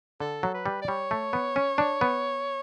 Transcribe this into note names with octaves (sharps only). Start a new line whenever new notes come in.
D3 A4
F#3
B4
G3
D5
G3 C#5
A3
B3
C#4
D4
B3